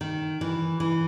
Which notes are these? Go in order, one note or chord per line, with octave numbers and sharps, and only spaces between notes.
D#3
E3
E3